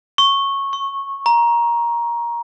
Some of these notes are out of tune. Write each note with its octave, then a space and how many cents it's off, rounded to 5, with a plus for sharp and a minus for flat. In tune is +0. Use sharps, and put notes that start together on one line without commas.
C#6 -10
C#6 -25
A#5 +15